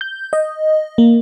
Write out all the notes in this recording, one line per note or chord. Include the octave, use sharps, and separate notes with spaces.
G6
D#5
A#3